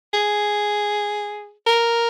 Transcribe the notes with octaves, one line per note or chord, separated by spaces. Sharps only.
G#4
A#4